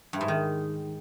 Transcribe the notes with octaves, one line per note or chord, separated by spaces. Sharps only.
G2
G#2
D#3